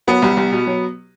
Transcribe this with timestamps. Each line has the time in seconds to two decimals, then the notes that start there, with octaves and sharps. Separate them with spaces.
0.07 F#3 B3
0.22 C2
0.37 C2
0.52 B2
0.67 F#3